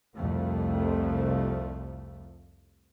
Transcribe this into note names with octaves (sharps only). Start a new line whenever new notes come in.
C2 F2 F3 A3